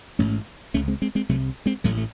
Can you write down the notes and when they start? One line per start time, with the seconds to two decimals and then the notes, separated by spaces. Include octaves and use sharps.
0.19 A1 G#2 A3 C#4
0.74 C#2 C#3 A3 C#4
0.88 G#3 C4
1.02 G#3 C4
1.15 G#3 C4
1.29 C2 C3 F#3 A3
1.66 G#3 C4
1.84 A1 A2 F#3 A3
1.97 A3